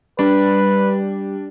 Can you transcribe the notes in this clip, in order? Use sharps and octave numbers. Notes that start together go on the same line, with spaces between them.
G3 D4 B4